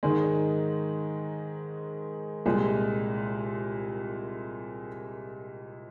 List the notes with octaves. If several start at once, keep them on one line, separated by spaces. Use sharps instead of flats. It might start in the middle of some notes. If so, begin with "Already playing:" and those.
G#2 D#3 G#3
C2 A#2 G#3